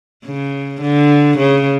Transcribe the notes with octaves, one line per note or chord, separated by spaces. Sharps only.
C#3
D3
C#3